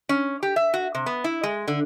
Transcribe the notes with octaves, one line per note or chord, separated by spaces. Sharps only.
C#4
G4
E5
F#4
C3
B3
E4
G#3
D3